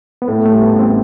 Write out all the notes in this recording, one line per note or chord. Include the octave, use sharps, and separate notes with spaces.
B3
A2 A3
A3
G3
B3
A1
C4